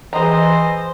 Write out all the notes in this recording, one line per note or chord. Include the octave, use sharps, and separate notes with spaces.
E3 G#4 C5 D#5 A#5